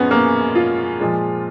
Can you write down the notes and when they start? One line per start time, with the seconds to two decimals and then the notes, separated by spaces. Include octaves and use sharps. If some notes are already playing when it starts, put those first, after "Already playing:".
Already playing: F#2 F3 G#3 B3 C#4
0.11 A#3
0.55 F4
1.00 A#2 F3 G#3